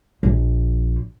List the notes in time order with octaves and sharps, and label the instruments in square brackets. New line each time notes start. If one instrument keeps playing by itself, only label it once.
[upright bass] A#1